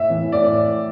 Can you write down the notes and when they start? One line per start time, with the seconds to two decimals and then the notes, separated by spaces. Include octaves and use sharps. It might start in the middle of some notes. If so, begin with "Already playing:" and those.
Already playing: A2 E5
0.10 E3
0.32 A2 D5